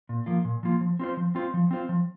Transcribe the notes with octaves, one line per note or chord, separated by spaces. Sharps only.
A#2
F3 A#3 F4
A#2
F3 A#3 F4
F3
C4 F4 C5
F3
C4 F4 C5
F3
C4 F4 C5
F3